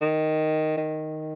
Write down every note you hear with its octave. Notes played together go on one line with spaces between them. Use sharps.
D#3
D#3